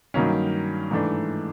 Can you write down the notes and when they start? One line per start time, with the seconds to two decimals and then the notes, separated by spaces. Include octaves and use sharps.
0.14 G2 D#3 F#3 A#3 C#4
0.91 G#2 E3 A3 D4